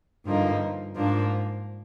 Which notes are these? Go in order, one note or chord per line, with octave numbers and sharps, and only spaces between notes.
G2 D3 F3 A#3 D#4
G#2 F3 A#3 D4